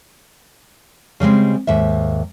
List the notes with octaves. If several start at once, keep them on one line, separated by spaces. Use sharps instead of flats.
C#3 G3 G#3 C4
D#2 G#2 E5